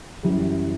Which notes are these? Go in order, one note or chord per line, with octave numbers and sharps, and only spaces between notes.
F#2 E3 G3